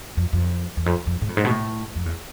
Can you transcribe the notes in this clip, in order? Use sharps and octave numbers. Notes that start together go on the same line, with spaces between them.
F2
F2
E2
F2
F2
G#2
F2
G#2
B2
A2
F2
E2